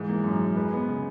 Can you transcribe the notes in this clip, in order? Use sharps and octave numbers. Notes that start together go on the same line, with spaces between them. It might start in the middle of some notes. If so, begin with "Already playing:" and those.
Already playing: G#2 E3
A#3
F#2
F#2
G#3 B4
B3
C#3